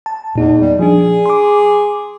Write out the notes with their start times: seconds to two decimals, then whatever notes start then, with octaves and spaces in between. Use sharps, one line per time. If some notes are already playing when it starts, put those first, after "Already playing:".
0.06 A5
0.35 E2 A#2 D#4
0.61 G3
0.79 F3 D4 G#4
1.26 C6 D6